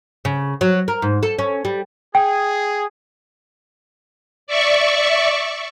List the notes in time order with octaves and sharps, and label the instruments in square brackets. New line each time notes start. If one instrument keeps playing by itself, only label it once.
[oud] C#3
F#3
A#4
G#2
A4
C#4
G3
[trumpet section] G#4 [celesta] G5
[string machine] D5 E5 C#6